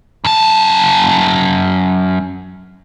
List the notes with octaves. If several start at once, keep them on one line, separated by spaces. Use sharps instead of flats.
F#2 A5